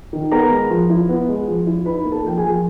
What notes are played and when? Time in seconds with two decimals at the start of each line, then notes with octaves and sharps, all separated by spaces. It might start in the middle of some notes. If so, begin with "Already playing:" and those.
0.13 D#3
0.32 B3 A#4 A#5
0.51 G#3
0.70 F3
0.90 E4
1.09 B3
1.28 G#3
1.48 F3
1.67 E4
1.85 D#4 B4 B5
2.05 A#3
2.12 A4 A5
2.25 F3 G5
2.37 G#4 G#5
2.43 F3